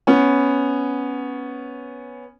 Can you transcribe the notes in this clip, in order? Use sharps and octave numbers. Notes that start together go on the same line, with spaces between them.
B3 C#4